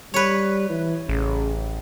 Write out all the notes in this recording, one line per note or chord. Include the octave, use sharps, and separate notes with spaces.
G3 B4 C#5
E3
A1 C#3